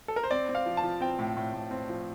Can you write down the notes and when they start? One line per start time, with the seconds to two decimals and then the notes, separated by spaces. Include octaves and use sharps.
0.08 A4
0.16 A#4
0.23 C5
0.31 C4 D5
0.49 C4
0.55 F5
0.66 F3
0.77 A5
0.83 F3
1.01 C4 G5
1.19 A2
1.37 A2
1.54 A2
1.71 C4
1.89 F3